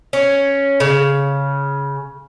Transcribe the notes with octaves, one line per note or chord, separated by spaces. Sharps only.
C#4
C#3